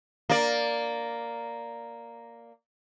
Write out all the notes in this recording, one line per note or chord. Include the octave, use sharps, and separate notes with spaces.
A#3 D5